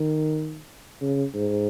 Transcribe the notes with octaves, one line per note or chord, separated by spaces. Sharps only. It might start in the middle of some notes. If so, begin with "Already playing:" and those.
Already playing: D#3
C#3
G#2